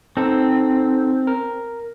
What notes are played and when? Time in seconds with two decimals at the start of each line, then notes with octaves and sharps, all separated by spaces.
0.17 C4 D#4 A4
1.27 A#4